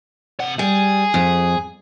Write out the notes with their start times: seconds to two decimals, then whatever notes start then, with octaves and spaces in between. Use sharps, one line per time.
0.40 C3 F#5
0.59 G3 G#4
1.14 F2